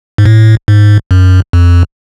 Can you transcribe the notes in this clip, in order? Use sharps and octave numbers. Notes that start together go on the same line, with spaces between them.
G#2
A2
G#2
F#2
F2